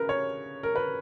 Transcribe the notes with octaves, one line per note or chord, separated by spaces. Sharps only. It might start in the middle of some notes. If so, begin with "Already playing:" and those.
Already playing: C#3 C#4 A#4 B4
C#5
A#4
B4